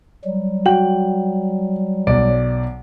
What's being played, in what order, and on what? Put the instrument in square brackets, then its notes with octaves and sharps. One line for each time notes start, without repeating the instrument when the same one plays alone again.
[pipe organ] F#3 G3
[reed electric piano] F#4 F#5 G5 [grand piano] F#7
[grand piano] B1 D5 D7